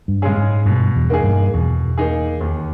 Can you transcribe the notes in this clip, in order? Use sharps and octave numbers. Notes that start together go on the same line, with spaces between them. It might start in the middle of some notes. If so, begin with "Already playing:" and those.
G2
C#3 G#3 C#4 G#4
G#2
G2 B2
E2
A#3 D#4 G#4
G2
E2 B2
A#3 D#4 G#4
D#2